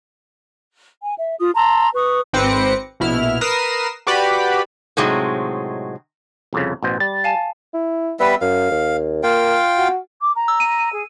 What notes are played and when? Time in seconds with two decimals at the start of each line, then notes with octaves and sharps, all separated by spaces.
1.02 G#5
1.16 E5
1.39 F4 D#6
1.55 A5 A#5 C6 E6
1.94 B4 C#6 D#6
2.33 G#1 C4 B4 D6 A#6 C#7
3.00 A#1 B2 E4 F6
3.41 A#4 B4 D#6 A#6 C7 E7
4.07 F#4 G4 B4 D5 B5
4.97 A2 C3 F#3 G#3 C4 D#4
6.53 C2 F2 C#3
6.83 A1 B2 C5
7.00 G3 A6
7.24 F5 G#5 A5
7.74 E4
8.20 G3 B3 B4 E5
8.41 F#2 F5
8.71 D#2
9.23 A#3 F4 F5 G5
9.78 F#4
10.21 D6
10.35 A#5
10.48 E6
10.60 D#7
10.92 G#4